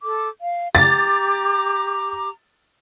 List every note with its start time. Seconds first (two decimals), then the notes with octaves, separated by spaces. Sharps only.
0.02 A4 D6
0.41 F5
0.75 G4 A#5 D6 A6